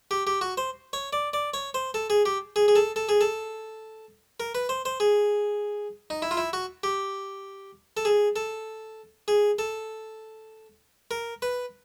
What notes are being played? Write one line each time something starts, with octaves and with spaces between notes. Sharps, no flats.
G4
G4
F#4
C5
C#5
D5
D5
C#5
C5
A4
G#4
G4
G#4
G#4
A4
A4
G#4
A4
A#4
B4
C5
C5
G#4
D#4
E4
F4
E4
F#4
G4
A4
G#4
A4
G#4
A4
A#4
B4